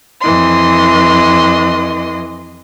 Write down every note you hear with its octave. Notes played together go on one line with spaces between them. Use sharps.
F2 E3 D#5 C6